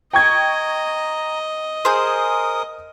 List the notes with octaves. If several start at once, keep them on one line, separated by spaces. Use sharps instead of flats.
D#5 G5 A#5 C#6 G#6
G#4 A#4 C5 D#6